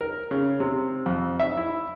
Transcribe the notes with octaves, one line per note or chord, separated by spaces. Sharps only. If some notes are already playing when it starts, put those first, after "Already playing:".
A#4
C#3
C3
F2
E5
E4